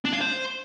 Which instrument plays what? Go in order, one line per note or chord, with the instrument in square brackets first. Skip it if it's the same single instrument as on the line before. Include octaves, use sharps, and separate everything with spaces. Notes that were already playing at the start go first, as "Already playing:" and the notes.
[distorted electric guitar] D4
F5
C5